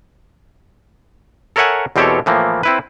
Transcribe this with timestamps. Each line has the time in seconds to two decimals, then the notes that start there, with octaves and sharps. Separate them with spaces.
1.56 A4 A#4 C#5 E5 F#5 G#5
1.96 E2 B2 C4 G4 A4 C#5
2.26 A2 E3 F3 A#3
2.63 C4 E4 B4